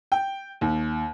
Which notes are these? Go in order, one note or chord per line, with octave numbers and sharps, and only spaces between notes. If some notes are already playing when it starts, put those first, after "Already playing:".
G5
D#2